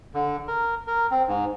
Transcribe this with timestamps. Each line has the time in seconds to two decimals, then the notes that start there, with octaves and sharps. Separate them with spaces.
0.14 D3
0.48 A#4
0.87 A#4
1.11 C4
1.28 G#2